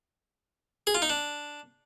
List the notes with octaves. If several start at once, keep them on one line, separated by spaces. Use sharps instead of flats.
G#4
F4
D#4
D4